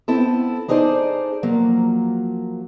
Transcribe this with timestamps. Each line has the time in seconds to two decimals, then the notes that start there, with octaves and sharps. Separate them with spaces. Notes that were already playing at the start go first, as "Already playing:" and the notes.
0.08 B3 C4 E4 A4
0.68 D4 D#4 G#4 A4 C5 D5
1.43 F3 F#3 A#3